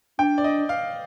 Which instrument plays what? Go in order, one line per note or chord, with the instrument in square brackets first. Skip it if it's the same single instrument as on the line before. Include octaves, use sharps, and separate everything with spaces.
[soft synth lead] D4 [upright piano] G5
[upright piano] D5
D#5
F5